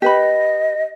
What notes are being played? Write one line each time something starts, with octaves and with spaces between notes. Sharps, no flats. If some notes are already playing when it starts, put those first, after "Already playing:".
G4 B4 D#5 B5